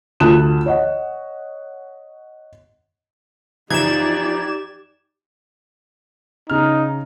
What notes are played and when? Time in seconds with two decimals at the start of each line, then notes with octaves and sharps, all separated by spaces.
0.20 D2 F4 A5 D#6 F#6 E7
0.66 C#5 D#5 F#5
3.70 F#2 E3 F3 D#4 G4 D5 G#6 E7
6.50 C#3 D#4 F6